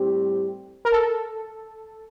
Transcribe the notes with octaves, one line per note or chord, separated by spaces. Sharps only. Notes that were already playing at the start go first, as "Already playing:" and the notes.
Already playing: A2 G3 C4 G4
A#4
A4